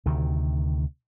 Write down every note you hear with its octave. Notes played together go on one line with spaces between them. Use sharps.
D2 C3 D#3